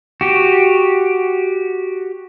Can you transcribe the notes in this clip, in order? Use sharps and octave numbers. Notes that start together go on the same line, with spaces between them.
F#4 G4